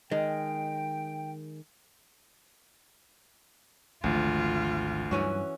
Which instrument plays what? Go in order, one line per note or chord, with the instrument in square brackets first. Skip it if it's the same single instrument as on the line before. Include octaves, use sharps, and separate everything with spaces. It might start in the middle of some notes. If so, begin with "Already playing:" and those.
[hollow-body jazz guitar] D#3 G#3 [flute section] G5
[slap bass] G#1 F3 [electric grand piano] D2 [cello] F4
[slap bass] G2 F#3 [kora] E3 C#4 F#4